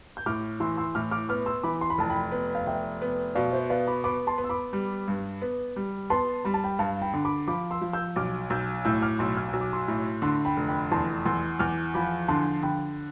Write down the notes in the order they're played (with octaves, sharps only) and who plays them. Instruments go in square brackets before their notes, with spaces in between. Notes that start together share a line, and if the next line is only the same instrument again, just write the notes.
[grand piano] G6
[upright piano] A2 [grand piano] D6 F6
[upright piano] E3 [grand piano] C6 E6
[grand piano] C6 E6
[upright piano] A2 [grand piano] D6 F6
[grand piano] D6 F6
[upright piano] B3 [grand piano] D6 F6
[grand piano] C6 E6
[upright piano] E3 [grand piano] B5 D6
[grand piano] C6
B5
[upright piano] F1 [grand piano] A5
[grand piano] G5 B5
[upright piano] B3
[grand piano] F5
[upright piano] F1 [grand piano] E5 G5
[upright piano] B3
[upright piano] B2 [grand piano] D5 F5
[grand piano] C5 E5
[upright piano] B3 [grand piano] D5 F5
[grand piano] B5 D6
[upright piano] B3 [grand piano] B5 D6
[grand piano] A5 C6
[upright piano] B3
[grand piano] E6
B5 D6
[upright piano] G3
G2
B3
G3
[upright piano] B3 [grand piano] A5 C6
[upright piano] G3 [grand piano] B5
[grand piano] A5
G5 B5
[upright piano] G2 [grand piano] F5 A5
[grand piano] G5 B5
[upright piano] D3
[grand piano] B5 D6
[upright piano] F3 [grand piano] B5 D6
[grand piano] C6 E6
[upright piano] F3
[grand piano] E6 G6
[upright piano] B1 [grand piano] D6 F6
[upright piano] B1 [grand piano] E6 G6
[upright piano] A2 [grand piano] E6 G6
[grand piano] D6 F6
[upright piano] B1 [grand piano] C6 E6
[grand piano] F6
[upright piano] B1 [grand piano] E6
[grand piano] D6
C6 E6
[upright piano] A2
[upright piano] D3 [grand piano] C6 E6
[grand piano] G5 B5
[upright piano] F1
[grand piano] G5 B5
[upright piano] E2 [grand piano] A5 C6
[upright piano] E2 [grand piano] C6 E6
[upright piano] E2 [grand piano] D6 F6
[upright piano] F3 [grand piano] B5 D6
[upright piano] D3 [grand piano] A5 C6
[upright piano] D3 [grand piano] G5 B5